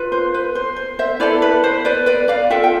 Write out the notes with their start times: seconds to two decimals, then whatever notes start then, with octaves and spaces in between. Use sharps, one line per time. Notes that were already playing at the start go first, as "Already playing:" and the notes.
Already playing: F4 B4
0.12 C5
0.34 B4
0.55 C5
0.76 C5
0.99 C5 E5
1.20 E4 A4 B4 D5
1.42 B4
1.64 C5
1.85 B4 D5
2.06 B4 D5
2.28 D5 F5
2.50 F4 A4 E5 G5
2.64 G5